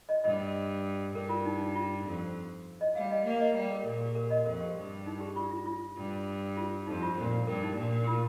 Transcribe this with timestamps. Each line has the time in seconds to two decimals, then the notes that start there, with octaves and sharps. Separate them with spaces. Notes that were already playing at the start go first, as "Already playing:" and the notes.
0.09 D#5
0.24 G2 D#5
1.14 G2 A#4
1.29 F4
1.45 D#4
1.60 D#4
1.75 F4
2.05 F2
2.81 D#5
2.95 G3 F5
3.11 D#5
3.25 A#3 F5
3.40 D#5
3.55 G3
3.71 A#4
3.85 A#2 A#4
4.01 G4
4.15 A#4
4.30 D#5
4.46 F2 A#4
4.61 G4
4.76 G2
5.06 D#4
5.21 G4
5.36 F4
5.51 F4
5.66 F4
5.97 G2
6.57 F4
6.86 F2 D#4
7.02 F4
7.17 A#2
7.47 G2 A#4
7.63 D#4
7.77 A#2
8.07 F4